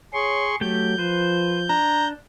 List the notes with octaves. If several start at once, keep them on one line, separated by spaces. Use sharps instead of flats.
G#4 C#5 C6 C#6
F#3 A3 G4 G5 G6
F3 B4 C5
D4 A#5